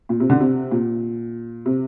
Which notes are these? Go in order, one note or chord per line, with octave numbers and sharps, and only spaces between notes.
A#2
C3
D3
C3
A#2
C3